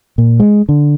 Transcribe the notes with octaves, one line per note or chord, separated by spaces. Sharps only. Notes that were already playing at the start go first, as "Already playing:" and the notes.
A#2
G#3
D3